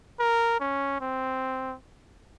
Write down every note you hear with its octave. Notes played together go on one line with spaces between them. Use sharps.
A#4
C#4
C4